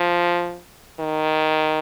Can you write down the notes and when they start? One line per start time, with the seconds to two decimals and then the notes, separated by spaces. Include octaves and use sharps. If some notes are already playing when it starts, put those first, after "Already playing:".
Already playing: F3
1.00 D#3